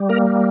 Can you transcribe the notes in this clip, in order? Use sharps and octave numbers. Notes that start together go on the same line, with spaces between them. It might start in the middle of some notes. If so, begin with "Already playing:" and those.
Already playing: G3
A#3 A#4